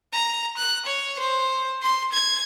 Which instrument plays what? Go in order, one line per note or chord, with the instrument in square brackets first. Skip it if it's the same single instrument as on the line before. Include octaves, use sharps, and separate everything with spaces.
[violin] A#5
F#6
C#5
C5
C6
G#6